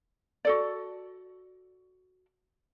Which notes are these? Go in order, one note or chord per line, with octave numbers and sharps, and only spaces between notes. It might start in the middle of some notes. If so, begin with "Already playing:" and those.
F#4 A4 D5